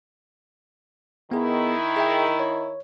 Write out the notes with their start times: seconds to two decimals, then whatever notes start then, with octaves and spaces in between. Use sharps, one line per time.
1.31 D#3 B3 E4 G#4
1.97 G#4 E5 G5
2.40 C#5